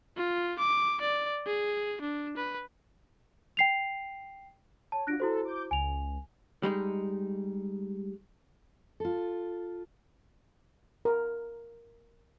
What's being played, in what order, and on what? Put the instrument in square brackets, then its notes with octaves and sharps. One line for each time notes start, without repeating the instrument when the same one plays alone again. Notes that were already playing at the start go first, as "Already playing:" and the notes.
[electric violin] F4
D6
D5
G#4
D4
B4
[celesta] G5 C7 F7
[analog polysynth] C#5 [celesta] A5
[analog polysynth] D4 F4 F#4 [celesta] F#6 A#6 D7
[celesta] E4 F#4 C5 [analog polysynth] A4
[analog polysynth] D6 G6
[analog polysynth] C#2 [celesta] G#5 F7
[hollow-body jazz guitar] G3 G#3 D#4
[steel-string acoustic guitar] F4 A4
[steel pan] A#4